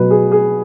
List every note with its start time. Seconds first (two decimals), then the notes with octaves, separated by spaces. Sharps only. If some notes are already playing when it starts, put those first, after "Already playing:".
Already playing: B2 F#3 B4
0.11 G#4
0.32 G#4